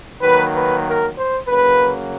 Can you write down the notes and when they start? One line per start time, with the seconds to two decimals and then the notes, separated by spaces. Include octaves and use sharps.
0.21 D#3 F#3 A#3 B4
0.52 B4
0.84 A#4
1.15 C5
1.46 C#3 F#3 A#3 B4